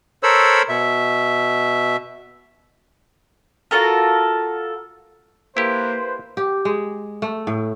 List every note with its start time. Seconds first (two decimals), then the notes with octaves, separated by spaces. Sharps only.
0.23 A4 A#4 C5 C#5 B5 E6
0.69 B2 E5
3.71 F4 F#4 A4 A#4
5.57 A#3 E4 G4 B4 C5
6.37 G4
6.65 G#3
7.22 A3
7.47 A2